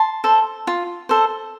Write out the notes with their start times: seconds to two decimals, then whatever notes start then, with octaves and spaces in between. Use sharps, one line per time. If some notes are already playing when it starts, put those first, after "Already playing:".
Already playing: A5 C6
0.24 A4 C5
0.67 F4
1.09 A4 C5